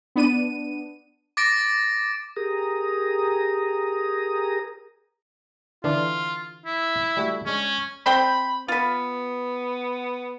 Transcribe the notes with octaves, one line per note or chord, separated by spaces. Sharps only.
B3 D4 D#7
D6 A6 A#6 D7
G4 G#4 A#4 A#5 D#6
D3 E3 D4 F4
E4
G3 A3 F#4
G#3 C#4 D4
C4 C5 G5 B5
B3 F4 B4